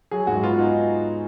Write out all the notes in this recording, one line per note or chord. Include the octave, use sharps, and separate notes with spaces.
F#3 G#4
G#2 F#4
B3 F4
D#4